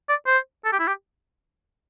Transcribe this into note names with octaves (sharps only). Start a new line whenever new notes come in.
D5
C5
A4
G4
E4
G4